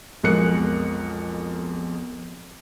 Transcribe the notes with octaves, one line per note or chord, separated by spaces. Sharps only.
B1 F2 G#3 A#4 F#6 C#7